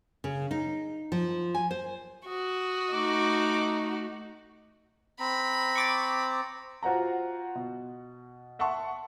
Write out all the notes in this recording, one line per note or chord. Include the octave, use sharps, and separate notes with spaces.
C#3
D#4
F3
G#5
C5
F#4 D#6
A3 D#4 D6
C4 A#5 B5
C#6 D6 A6
F4 F#4 C5 F#5 A#5
B2
E5 F#5 A5 C6 C#6